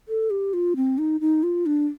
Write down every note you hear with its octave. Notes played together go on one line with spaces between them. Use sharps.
A4
G4
F4
C4
D#4
D#4
F4
D4